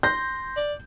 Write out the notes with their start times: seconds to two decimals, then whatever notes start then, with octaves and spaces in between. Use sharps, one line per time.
0.03 C6 G6 A#6
0.57 D5